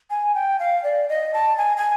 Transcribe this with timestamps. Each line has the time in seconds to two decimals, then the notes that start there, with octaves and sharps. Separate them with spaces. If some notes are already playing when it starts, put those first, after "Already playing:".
0.10 G#5
0.35 G5
0.59 F5
0.84 D5
1.09 D#5
1.34 A5
1.58 G#5
1.77 G#5